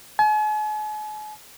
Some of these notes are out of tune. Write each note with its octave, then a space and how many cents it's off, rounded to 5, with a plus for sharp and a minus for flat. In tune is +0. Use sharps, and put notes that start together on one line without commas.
G#5 +45